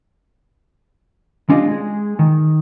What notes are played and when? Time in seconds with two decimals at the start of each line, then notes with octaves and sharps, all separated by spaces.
1.49 G#3 C#4 D4 F4 G4 D#5
1.68 G#3 G#4
2.19 D#3